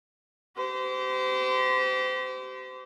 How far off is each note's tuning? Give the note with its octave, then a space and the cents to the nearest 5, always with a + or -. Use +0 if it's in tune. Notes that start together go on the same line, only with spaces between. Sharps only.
G4 -35 C5 -35